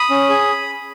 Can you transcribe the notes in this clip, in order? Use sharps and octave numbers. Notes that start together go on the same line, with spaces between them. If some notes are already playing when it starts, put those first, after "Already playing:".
Already playing: B5 D#6
C#4
G#4